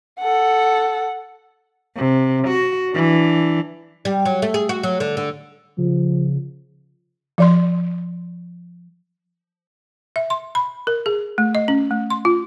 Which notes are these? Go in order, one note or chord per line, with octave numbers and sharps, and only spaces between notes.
A4 F#5
C3
F#4
E3 D4
G3
F#3
A3
G#4
F#4
F#3
D3
D3
C#3 F3
F3 D5 C6
E5
C6
B5
A#4
G#4
A3
D#5
C#4
A3
C6
F4